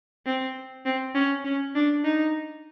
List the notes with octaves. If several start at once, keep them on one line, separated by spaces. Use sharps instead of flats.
C4
C4
C#4
C#4
D4
D#4